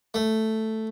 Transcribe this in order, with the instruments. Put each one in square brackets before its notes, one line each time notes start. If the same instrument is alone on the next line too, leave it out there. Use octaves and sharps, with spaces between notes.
[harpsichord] A3